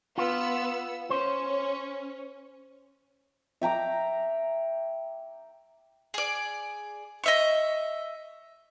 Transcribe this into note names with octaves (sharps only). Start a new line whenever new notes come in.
B3 F4 E6
C#4 C5
E5 G5 A#5 D6
G#4 D5
D#5 E5 C#6